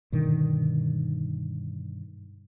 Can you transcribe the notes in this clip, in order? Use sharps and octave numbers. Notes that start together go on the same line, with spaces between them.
G2 B2 D3 D#3